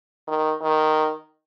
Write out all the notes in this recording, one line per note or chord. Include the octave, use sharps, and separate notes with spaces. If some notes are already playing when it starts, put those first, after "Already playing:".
D#3
D#3